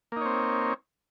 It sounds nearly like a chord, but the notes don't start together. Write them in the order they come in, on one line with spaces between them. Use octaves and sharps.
A#3 D#4 C#5 C4